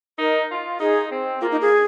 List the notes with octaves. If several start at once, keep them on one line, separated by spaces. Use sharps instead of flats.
D#4 A#4
F4
D#4 G#4
C4
A#3 F4
D#4
G#4